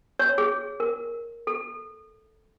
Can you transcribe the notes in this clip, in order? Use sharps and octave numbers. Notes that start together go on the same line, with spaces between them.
C#5
G#4
A#4
A4